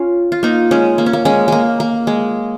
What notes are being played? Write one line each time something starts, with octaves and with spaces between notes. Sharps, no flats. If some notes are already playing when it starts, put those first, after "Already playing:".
Already playing: C#4 F4
F4
A#3 D#4
G#3 C#4
A#3
C#4
A#3
G#3 C#4
G#3 A#3
A#3
G#3